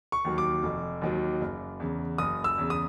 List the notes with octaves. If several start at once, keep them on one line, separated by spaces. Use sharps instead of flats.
C#6
D#2 D#3 F#3
D6
F1
D#2 D#3 F#3
F#1
E2 C#3
F#1 D#6
E6
E2 C#3
D#6